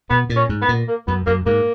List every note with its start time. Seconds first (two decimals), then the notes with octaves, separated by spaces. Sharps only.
0.10 B2 B3
0.30 A#2
0.36 C#4
0.49 G#2
0.62 B3
0.69 A#2
0.88 A#3
1.07 F#2 B3
1.26 F#2 A#3
1.46 G#2 A#3